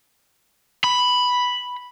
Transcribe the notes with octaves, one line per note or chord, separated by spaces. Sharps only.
B5